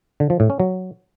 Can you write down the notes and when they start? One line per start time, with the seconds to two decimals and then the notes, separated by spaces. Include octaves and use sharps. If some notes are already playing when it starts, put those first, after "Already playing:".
0.20 D3
0.30 F3
0.40 A2
0.50 C#4
0.60 F#3